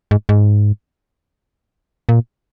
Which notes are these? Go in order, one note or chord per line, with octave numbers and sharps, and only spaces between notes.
G#2
G#2
A#2